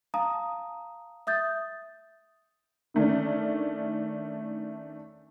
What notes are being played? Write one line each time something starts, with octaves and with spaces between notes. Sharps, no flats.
F5 A5 A#5 D#6
E5 D#6 G6 A6
D#3 A3 C#4 D4